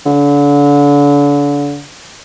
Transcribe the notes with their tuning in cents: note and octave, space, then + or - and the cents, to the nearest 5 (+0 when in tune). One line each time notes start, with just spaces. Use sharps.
D3 -35